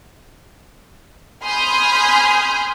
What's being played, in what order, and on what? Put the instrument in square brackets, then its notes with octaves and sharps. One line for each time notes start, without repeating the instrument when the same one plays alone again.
[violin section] G#5 B5 C6 D#6 F6 G6